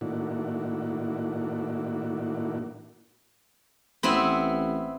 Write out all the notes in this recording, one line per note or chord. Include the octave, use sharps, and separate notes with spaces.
A2 D#3 A#3 D4 E4 F#4
A1 B3 C4 E4